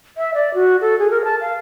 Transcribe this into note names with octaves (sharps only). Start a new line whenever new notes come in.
E5
D5
F#4
A4
G#4
A#4
A5
F5